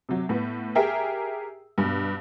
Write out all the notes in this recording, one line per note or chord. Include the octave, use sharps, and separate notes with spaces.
C3 F#3
A2 B3
G4 G#4 A#4 E5 G5
G2 B2